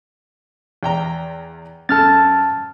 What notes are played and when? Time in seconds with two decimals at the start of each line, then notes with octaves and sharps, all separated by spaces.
0.83 E2 G5 A#5
1.89 F#2 A4 A5 F6 A6